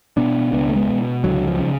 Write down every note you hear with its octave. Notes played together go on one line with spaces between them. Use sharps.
B2 B3 D4
C#2 B3 D4
A3
G#3 B3
B2
C#2 D3 F#3
F3
C#3